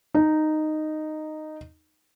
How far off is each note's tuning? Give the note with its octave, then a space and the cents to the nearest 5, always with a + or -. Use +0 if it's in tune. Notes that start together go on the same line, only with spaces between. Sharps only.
D#4 -10